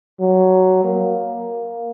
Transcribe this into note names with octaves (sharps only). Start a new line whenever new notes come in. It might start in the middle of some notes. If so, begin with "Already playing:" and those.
F#3
A#3